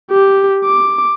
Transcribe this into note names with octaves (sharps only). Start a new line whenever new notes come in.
G4
D6